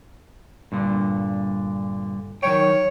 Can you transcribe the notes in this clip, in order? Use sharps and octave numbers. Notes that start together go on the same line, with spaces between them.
G2 A#2 D3
D#3 F#3 C#5 G5